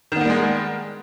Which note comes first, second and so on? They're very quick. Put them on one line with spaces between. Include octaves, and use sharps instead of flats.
D#3 B3 A#3 G3 G#3